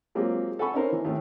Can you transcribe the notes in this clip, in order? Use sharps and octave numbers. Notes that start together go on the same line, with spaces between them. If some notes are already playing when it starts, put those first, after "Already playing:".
F#3 G#3 A#3 C4 F4 G4
A4 F#5 G#5 B5 C#6
C#4 D#4 A#4 C5
E3
D#2 A3